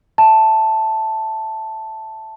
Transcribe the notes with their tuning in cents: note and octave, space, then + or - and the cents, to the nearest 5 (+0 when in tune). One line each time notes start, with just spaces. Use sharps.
E5 -5 A5 +0